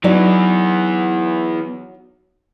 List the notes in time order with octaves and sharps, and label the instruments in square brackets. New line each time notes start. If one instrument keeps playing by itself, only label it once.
[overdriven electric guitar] E3 B3 [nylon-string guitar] F#3 D#4 D5